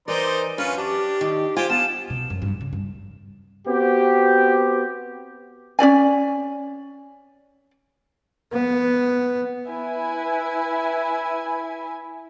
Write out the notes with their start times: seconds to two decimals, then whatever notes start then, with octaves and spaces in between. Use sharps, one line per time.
0.08 E3 D#4 A#4 C5 D5
0.58 F#2 C#4 F4 B4
0.77 D4 G4
1.21 D#3
1.57 F4 G4 C5 G#5
1.70 B3 F4 A5 E7
2.10 B2
2.30 F#2
2.42 G2
2.61 C#3
2.73 G2
3.68 B3 C4 F#4 G4
5.79 C#4 F#4 D5 G#5
8.53 B3
9.69 E4 B4 G#5